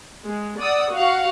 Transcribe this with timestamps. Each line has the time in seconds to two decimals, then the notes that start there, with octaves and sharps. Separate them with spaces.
0.24 G#3
0.58 D5 F#5 D#6 E6
0.92 F#4 F5 F#5